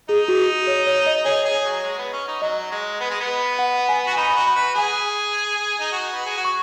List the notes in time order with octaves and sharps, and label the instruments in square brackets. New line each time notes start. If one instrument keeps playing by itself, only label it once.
[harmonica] D#4 [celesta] G#4
[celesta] F#4
C#5
C#5
D#5
[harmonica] G#4 [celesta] C#5
[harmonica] G#4
F#3
G#3
B3
C#4
D#4
[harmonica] F#3 [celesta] D#5
[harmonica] G#3
B3
G#3
B3
[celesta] F#5
G#5
[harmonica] F#4
[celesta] G#5
[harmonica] D#4 [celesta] B5
[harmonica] F#4
[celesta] B5
[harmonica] B4
[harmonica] G#4 [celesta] G#5
[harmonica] D#4
F#4
B4
G#4
F#4
[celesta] C#6